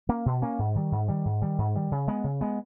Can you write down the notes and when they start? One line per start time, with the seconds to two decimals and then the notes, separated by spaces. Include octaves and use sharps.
0.09 A#3 C#4
0.26 B2
0.42 A#3 C#4
0.59 G#2
0.75 D#3 G3
0.92 G#2
1.08 D#3 G3
1.25 G#2
1.42 D#3 G3
1.58 G#2
1.75 D#3 G3
1.91 C#3
2.08 G#3 B3
2.24 C#3
2.41 G#3 B3